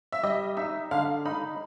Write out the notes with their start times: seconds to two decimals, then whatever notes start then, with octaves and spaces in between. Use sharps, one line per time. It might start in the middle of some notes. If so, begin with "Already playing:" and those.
0.12 E5
0.23 G3 D#5
0.57 D#4 E5
0.91 D3 F5
1.26 D#4 B5